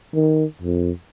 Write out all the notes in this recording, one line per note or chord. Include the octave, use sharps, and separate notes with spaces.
D#3
F2